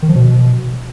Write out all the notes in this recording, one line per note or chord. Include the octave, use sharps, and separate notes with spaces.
D#3
F3
B2